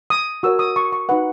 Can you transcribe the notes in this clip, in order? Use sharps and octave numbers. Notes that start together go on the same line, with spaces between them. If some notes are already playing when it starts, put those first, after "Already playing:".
D#6
F#4 A#4 C#5 E6
D#6
C#6
C#6
D#4 F#4 B4 F#5